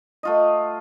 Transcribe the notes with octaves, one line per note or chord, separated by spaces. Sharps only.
A3 F4 D#5